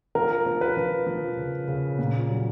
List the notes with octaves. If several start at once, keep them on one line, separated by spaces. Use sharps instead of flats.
F3 A#4
F3
B4
F3
F3
C#3
C#3
A#2
F#3